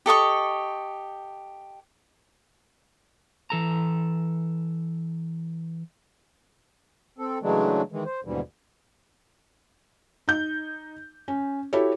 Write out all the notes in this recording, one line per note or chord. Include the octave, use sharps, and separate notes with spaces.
G4 A4 D#5 C#6
E3 A4 A#5
C4 A4
C#3 E3 F#3 G#3 A3 D4
D#3 E3 G#3
C5
D#2 G#2 B2 D3 E3 G3
D#4 G6
C#4
E4 F#4 G4 A4 C#5